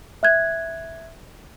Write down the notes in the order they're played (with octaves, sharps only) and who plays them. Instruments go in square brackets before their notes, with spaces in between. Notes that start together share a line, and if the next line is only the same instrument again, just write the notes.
[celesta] E5 F#6 G#6